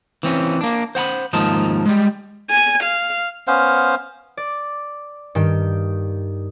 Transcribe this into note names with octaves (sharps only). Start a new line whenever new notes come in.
E3 C4 C#4
A#3 D4
C5 F#5 G5 B5
D#2 G#2 F3 D#4 A#4 A5
G3 G#3
G#5
F5
B3 C#4 C5 F5
D5
G2 D#3 G5